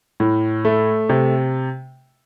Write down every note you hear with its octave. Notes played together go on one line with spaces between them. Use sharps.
A2
A3
C3